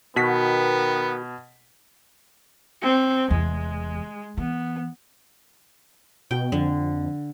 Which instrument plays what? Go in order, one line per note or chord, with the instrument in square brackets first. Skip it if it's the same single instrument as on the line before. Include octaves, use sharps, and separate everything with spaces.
[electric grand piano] B2 B6 [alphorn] D#3 [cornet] B3 [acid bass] F#4
[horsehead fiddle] C4
[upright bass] F1 E2 [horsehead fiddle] G#3
[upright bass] E3 [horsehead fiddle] B3
[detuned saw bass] B2 [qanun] G5
[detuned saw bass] F2 [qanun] D3